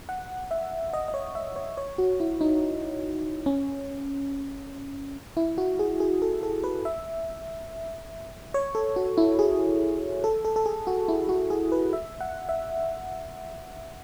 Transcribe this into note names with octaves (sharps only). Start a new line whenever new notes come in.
F#5
E5
D#5
D#5
C#5
E5
C#5
C#5
F#4
E4
D#4
C#4
E4
F#4
G#4
G#4
A4
A4
B4
E5
C#5
A4
F#4
E4
G#4
A4
A4
A4
G#4
F#4
E4
F#4
G#4
B4
E5
F#5
E5